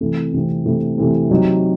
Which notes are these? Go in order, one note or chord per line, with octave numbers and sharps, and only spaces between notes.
C3 E3 A3 C4
C3 E3 A3 C4
C3 E3 A3 C4
C3 E3 A3 C4
C3 F#3 C4 D#4